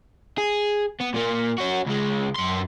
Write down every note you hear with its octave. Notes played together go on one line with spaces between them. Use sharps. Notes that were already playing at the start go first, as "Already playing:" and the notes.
G#4
B3
A#2 A#3
C#4 F#4
C#2 G#3
F#2 C6